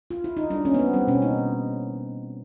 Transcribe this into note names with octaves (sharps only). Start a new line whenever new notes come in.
F4
E4
D#4
G3 D4
A#3 C#4
B3
A#3 C4
G3 C4
B2 C#4
A#3 D#4
B2